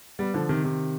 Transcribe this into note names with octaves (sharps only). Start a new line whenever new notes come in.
G3 B3
D3 F3
C3 D#3
C3 D#3